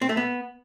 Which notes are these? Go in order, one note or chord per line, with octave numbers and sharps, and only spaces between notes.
C4
A3
B3